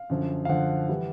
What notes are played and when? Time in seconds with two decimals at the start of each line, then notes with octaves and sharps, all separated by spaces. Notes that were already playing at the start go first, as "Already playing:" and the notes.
Already playing: F5
0.10 F#2 D3 F3
0.45 F5
0.49 F#2 D3 F3 F#5
0.89 E3 G3